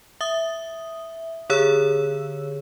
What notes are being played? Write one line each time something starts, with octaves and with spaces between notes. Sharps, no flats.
E5 D#6
D3 G#4 C#5 E6